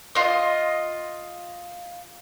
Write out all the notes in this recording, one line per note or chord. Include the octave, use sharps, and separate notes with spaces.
F4 D#5